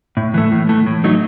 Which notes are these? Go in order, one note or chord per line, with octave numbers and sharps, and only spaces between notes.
A2
E3 A3
A2
E3 A3
A2
F#3 A3 D#4